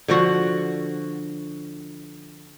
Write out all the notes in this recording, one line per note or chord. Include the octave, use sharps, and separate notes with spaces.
D3 F3 F#4